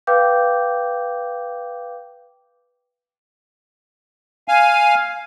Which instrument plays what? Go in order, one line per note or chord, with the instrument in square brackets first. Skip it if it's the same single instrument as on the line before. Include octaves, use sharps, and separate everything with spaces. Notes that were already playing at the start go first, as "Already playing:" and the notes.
[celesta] B4 F5 G5 D6 G6
[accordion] F5 G#5